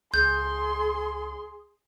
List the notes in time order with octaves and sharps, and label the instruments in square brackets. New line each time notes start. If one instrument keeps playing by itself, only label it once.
[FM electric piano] C#2 [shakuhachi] G#4 [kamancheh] C6 [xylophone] G6